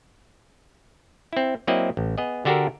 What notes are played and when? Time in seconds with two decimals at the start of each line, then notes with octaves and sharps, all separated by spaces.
1.33 C4 E4
1.67 F#3 A#3 C4 E4 D5 D#5
1.97 A1
2.18 B3 G#4 D#5
2.45 D3 D4 F#4 G4 A4 A#4